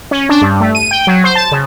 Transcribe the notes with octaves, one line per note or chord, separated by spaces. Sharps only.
C#4
D4
G2
A3
D#7
G5
F#3
C5
A5
C#3